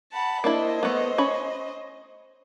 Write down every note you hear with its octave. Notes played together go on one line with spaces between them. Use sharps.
F#5 A5 B5
A#3 D4 E4 C5 D#5
A3 B3
C#4 B5